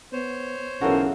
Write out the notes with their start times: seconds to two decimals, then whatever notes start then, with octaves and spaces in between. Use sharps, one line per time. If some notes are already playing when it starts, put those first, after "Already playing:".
0.13 B3 C5 C#5
0.81 B1 C#3 E3 C#4 F#4 A4 A#4